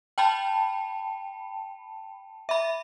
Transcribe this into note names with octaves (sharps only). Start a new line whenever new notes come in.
G5 A5 B5
E5 B5